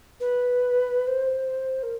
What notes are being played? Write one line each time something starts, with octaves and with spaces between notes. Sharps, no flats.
B4
C5
A#4